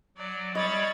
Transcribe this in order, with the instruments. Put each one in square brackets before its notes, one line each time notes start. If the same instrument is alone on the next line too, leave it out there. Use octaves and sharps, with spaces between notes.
[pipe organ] F#3 [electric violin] D5
[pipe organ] G3 C#5 B5 [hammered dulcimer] D#5 [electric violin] C#6 A6